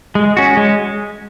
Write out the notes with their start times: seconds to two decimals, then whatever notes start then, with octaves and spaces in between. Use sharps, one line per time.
0.15 G#3
0.37 C#4 F#4
0.57 G#3